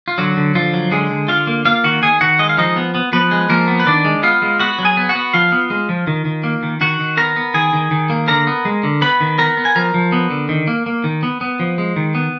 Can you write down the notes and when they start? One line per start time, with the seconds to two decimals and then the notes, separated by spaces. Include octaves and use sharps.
0.08 F4
0.18 D3 F#3 F#4
0.37 D3
0.55 D3 F3 F4
0.74 F#3
0.91 D3 G#3 G#4
1.11 D3
1.28 D3 F4 F5
1.47 A#3
1.65 A#3 F4 F5
1.84 D#3 F#4 F#5
2.02 D#3 G#4 G#5
2.21 D#3 F#4 F#5
2.39 G#3 D#5
2.49 F5
2.57 F3 D#4 D#5
2.76 B3
2.95 B3
3.13 F3 B3 B4
3.31 G#3
3.49 F3 A#3 A#4
3.68 B3
3.80 B4
3.86 D#3 D4 D5
4.05 G#3
4.23 B3 F4 F5
4.42 G#3
4.59 B3 F#4 F#5
4.79 F#3
4.85 G#4 G#5
4.97 B3
5.09 F#4 F#5
5.15 B3
5.33 F3 F4 F5
5.52 B3
5.70 G#3
5.89 F3
6.07 D#3
6.25 D#3
6.44 A#3
6.63 D#3
6.81 D#3 F#4 F#5
6.99 D#3
7.17 B3 A#4 A#5
7.36 B3
7.54 D#3 G#4 G#5
7.73 D#3
7.91 D#3
8.10 A#3
8.28 D3 A#4 A#5
8.47 B3
8.65 G#3
8.83 D3
9.01 B3 B4 B5
9.21 D#3
9.38 B3 A#4 A#5
9.57 B3
9.65 G#5
9.75 F3 A#4 A#5
9.94 F3
10.12 B3
10.30 D3
10.49 D#3
10.67 A#3
10.86 A#3
11.04 D#3
11.23 B3
11.41 B3
11.60 F3
11.78 G#3
11.96 D#3
12.15 B3